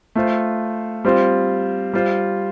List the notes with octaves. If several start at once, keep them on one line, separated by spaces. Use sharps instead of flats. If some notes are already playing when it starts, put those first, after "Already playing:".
A3 F4 C5
G3 C4 F4 C5
G3 F4 C5